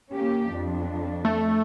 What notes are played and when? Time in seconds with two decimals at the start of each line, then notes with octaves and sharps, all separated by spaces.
0.13 A#3 C#4 G4
0.49 F2 D4
1.25 A3